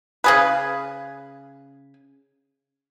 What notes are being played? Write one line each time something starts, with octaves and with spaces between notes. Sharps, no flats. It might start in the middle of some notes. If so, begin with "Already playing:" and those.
C#3 G#4 B4